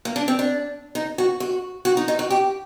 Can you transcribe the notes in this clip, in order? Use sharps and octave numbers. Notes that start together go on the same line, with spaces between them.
A#3
D4
C4
D4
D#4
F#4
F#4
F#4
D#4
D#4
F#4
G4